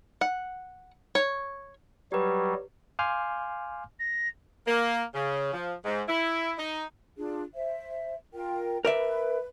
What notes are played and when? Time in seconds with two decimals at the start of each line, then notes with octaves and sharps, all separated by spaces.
0.21 F#5
1.15 C#5
2.12 F#3 G3 G4 B4
2.99 F5 G#5 C6 D6 F6 G6
3.99 A#6
4.66 A#3
5.14 C#3
5.53 F3
5.85 G#2
6.07 E4
6.57 D#4
7.17 D4 F4 G#4
7.53 C5 E5
8.33 F4 A#4 G5
8.85 A#4 B4 D5 E5